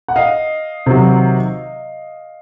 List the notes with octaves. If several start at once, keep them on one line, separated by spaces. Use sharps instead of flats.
F#5
D#5 F5
C3 D#3 F#3